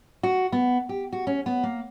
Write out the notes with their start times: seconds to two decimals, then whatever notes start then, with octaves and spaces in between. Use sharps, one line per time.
0.23 F#4
0.52 B3
0.89 G4
1.12 F#4
1.27 C#4
1.46 B3
1.63 A#3